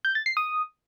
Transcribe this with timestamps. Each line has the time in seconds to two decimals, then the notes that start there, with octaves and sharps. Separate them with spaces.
0.05 G6
0.15 A6
0.26 C7
0.37 D#6